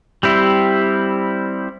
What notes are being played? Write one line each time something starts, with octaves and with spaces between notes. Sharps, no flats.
G3 C4 E4